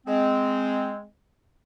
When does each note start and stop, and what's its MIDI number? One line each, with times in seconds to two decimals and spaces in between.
0.07 1.05 56
0.07 1.05 60